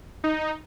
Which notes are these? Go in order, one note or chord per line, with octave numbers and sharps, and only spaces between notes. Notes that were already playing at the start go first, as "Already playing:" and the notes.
D#4